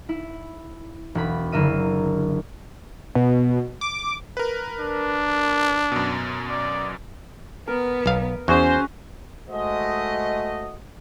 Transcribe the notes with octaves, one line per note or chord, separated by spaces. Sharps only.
E4
E1 B5
F#1 D3 A#4 E5 D#7
B2
D6
A#4 B4
D4
F#2 B2
D5
B3 A#4
B1 F5
E2 C#4 F#4 G#4 C5
G#3 A3 F#4 C5 D#5